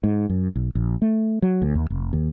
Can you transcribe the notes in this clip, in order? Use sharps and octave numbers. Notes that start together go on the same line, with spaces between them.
G#2
F#2
B1
A#1
A3
F#3
D2
D#2
F1
D#2